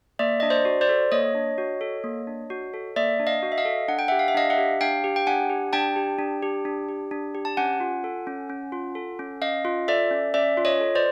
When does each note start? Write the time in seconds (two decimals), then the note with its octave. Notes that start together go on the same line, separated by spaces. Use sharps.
0.19 A#3 D5 E5
0.40 D4 D#5
0.50 C5 D5
0.65 F#4
0.81 C5 D5
0.89 A4
1.12 A#3 C#5 D#5
1.35 D4
1.58 F#4
1.81 A4
2.04 A#3
2.27 D4
2.50 F#4
2.74 A4
2.96 A#3 D5 E5
3.20 D4
3.27 D#5 F5
3.43 F#4
3.52 E5
3.58 D#5 F5
3.65 A4
3.88 D4 F#5
3.99 G5
4.08 G4 E5 F#5
4.19 F5
4.28 E5
4.34 D4 D#5 F5
4.50 E5 F#5
4.58 G4
4.81 D4 F5 G5
5.04 G4
5.16 G5
5.27 D4 F#5 G#5
5.50 G4
5.73 D4 G5 A5
5.96 G4
6.19 D4
6.42 G4
6.65 D4
6.89 G4
7.11 D4
7.35 G4
7.45 A5
7.57 C#4 F#5 G#5
7.80 F4
8.04 A4
8.27 C#4
8.49 C#4
8.72 F4
8.95 A4
9.19 C#4
9.42 C#4 D#5 F5
9.65 F4
9.88 A4 D5 E5
10.11 C#4
10.34 C#4 D5 E5
10.57 F4
10.65 C#5 D#5
10.81 A4
10.95 C5 D5